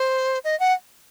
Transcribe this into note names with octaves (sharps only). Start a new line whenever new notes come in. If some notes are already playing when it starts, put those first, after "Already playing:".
Already playing: C5
D#5
F#5